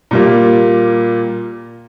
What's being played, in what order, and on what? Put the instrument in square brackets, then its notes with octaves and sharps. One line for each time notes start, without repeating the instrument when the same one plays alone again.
[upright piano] A#2 G3 A#3